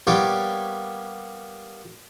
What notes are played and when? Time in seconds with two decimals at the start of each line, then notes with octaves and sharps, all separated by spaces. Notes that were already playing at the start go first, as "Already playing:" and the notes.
0.07 G3 A#3 B3 C#5 D5 G5